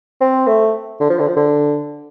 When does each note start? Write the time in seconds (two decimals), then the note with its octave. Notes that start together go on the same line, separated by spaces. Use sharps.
0.21 C4
0.47 A3
1.00 D3
1.10 F3
1.19 D3
1.28 F3
1.36 D3